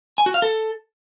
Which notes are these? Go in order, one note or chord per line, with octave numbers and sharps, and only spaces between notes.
G#5
F#4
F5
A4